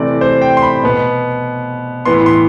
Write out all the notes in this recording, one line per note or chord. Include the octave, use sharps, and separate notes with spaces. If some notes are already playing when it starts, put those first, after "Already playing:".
Already playing: C3 E3 A3 C4 D5
C5
G5
C6
B5
B2 B3
A2 E3 B3 C6
C6